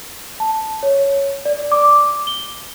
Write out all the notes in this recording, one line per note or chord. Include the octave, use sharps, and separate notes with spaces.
A5
C#5
D5
D6
G7